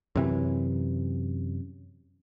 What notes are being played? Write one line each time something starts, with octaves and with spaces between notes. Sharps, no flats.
F#2 C3 E3